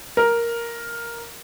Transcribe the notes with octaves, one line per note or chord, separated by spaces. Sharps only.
A#4